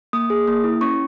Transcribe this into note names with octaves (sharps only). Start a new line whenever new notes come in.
A#3 D#6
G#4
A#3
E4
C#4 C#6